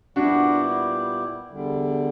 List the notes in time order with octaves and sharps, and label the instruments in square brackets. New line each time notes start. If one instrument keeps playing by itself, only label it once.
[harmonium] A#2 G3 B3 E4 G4 [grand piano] D4 F#4
[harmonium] E2 D3 G3